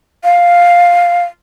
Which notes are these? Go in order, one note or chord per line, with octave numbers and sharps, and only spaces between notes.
F5